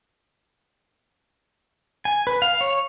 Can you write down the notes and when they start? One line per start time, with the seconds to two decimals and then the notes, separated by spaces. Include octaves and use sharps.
2.05 G#5
2.27 B4
2.42 F5
2.61 C#5